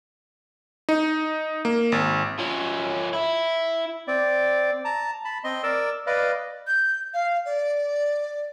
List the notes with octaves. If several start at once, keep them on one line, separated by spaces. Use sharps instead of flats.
D#4
A#3
G#1
F3 C#4
E4
C4 D5
A5 A#5
A5 B5
C4 D#5 C6
A#4 D5 E6
B4 D5 D#5 F5
G6
F5
D5